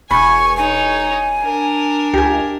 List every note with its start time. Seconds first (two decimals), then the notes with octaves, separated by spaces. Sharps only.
0.11 E1 G#5 B5 C#6
0.57 D#4 C#5 G#5
1.43 D4 A#4
2.14 C#2 G4 G#5